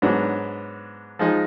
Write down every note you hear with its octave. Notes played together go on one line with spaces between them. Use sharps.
G#2 F#3 B3 D4
F3 G#3 D#4 G#4